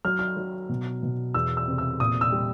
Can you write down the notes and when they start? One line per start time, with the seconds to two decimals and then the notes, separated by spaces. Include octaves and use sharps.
0.05 F#3 F6
0.19 F6
0.37 F#3
0.69 B2
1.03 B2
1.34 E2 E6
1.57 E6
1.68 C3
1.78 E6
2.00 A#2 D#6
2.21 E6
2.32 G3